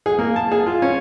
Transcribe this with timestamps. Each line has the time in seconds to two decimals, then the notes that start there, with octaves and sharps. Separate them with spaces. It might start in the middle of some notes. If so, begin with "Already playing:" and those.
0.06 G#4
0.19 A#3
0.36 A5
0.52 G#4
0.66 F4
0.82 C#4